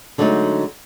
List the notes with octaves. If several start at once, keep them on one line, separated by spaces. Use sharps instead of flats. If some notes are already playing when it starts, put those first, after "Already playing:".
D3 F#3 G#3 A3 C#4 D#4